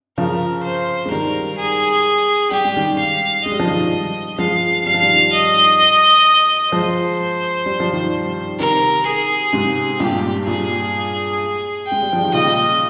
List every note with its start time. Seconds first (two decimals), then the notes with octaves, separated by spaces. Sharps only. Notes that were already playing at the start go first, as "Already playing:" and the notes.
0.18 C#3 F3 A#4
0.64 C5
1.05 G#3
1.11 D#3 G3 A#4
1.58 G#4
2.51 G3 G4
2.64 G#3
2.76 D#3 G3
2.99 F5
3.45 G#3 D#5
3.52 G3
3.59 F3
3.67 D#3 G3
4.38 F3 G#3 F5
4.86 G3 F5
4.94 F3
5.02 D#3 G3
5.32 D#5
6.72 F3 G#3 C5
7.66 G3
7.80 F3
7.93 D#3 G3
8.59 C3 D#3 A#4
9.06 G#4
9.53 G#2 C3
10.00 G2 A#2 G4
10.47 G2 A#2 G#4
11.87 G#3 G5
12.02 G3
12.13 F3
12.23 D#3
12.33 A#2 C#3 D#5